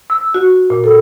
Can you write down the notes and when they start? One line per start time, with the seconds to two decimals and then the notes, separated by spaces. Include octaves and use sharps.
0.10 E6
0.34 F#4
0.70 A#2
0.84 A4